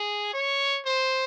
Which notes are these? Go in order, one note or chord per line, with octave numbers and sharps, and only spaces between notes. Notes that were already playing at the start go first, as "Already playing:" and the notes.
Already playing: G#4
C#5
C5